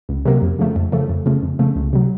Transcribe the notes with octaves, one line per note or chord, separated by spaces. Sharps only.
C#2
C3 F#3 A#3
F2
C#3 F3 A3
F2
C#3 F3 A3
F2
C#3 F3 A3
F2
C#3 F3 A3
C#2
C3 F#3